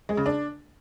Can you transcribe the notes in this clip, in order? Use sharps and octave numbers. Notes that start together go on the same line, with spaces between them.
G#3
C#3
D4